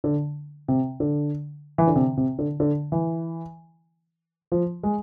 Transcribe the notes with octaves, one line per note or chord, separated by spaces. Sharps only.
D3
C3
D3
E3
D3
C3
C3
D3
D3
E3
F3
G#3